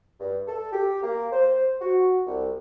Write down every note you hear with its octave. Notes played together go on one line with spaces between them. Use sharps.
G2
A4
G4
A#3
C5
F#4
C2